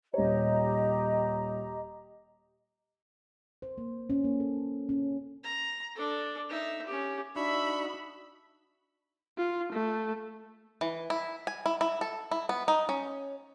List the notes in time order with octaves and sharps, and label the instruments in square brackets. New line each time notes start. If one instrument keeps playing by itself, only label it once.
[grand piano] D#1 C#5 [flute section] G4 D#5 A#5
[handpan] C5
A#3
C#4
A#3
A4
C#4
[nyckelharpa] A#5
D4 A4
D#4 E5
C#4 G4
[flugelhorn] D4 [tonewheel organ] D#4 F#4 [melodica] E5 C#6 E6 [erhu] B5
[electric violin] F4
A3
[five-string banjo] E3
E4
G#5
E4
E4
A4
E4
B3
D#4
C#4